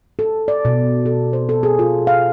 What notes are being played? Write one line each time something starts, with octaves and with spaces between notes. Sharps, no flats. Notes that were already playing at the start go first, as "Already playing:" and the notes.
A4
D5
B2
A4
C5
A4
G#4
F4
F5